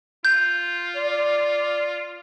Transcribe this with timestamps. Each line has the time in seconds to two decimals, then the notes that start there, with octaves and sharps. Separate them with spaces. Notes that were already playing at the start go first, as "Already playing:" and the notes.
0.25 F4 G6
0.96 D5